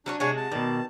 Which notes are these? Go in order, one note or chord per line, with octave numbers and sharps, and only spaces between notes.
F#3 C#4 D4 C#5
C3 G#3 D4 F#4 C#5 G#5
A5
B2 D#3 D5